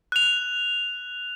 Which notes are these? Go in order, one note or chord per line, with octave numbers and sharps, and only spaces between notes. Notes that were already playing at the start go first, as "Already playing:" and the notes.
F#6 F7